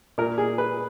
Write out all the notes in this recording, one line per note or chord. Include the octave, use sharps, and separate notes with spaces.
A#2 A#4
G#4
B4